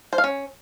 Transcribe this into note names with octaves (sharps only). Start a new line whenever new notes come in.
C5
F5
C#4